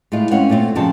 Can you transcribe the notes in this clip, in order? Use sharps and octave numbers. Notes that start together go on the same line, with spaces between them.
A2 G#3 A3 F4
G#3 C4 C#4 C#5 F5 F#5
A#2 A3 C4 D#4 F4
F#2 C#3 F3 G5 A5